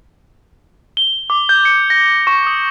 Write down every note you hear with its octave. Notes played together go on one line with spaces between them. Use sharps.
G7
D6
G6
C#7
A#6
C#6
D#6